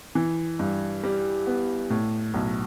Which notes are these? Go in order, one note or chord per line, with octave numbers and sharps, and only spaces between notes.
E3
G2
G3
B3
A2
B1